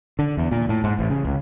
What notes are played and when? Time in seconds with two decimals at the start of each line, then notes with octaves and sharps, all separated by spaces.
0.19 D3
0.37 E2
0.51 A#2
0.69 A2
0.84 G#2
0.99 A1
1.10 C#3
1.25 C#2